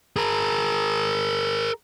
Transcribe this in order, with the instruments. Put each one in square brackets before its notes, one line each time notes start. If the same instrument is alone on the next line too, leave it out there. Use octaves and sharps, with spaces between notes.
[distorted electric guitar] G#4 A#4